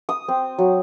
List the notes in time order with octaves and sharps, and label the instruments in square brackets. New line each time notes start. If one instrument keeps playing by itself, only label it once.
[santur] D#6
C4
F#3